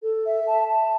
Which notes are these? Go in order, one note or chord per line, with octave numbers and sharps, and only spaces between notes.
A4
E5
A5
A5